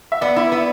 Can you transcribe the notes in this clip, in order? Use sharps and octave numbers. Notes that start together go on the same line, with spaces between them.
E5
B3 D5
E4
B3